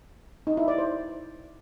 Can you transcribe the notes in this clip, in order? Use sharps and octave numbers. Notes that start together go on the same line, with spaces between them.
D#4
E4
D5
C5